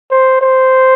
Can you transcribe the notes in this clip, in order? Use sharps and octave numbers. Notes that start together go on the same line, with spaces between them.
C5
C5